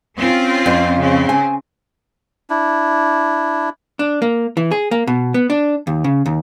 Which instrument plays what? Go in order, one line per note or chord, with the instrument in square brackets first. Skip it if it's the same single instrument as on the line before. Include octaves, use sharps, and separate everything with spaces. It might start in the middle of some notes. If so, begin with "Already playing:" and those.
[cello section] C4 C#4 F4
[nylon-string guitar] F2
[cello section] C#3 C4
[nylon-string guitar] G#5
[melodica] D4 E4
[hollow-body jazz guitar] D4
A#3
E3
G#4
A#3
B2
B3
D4
D#2
C#3
D#2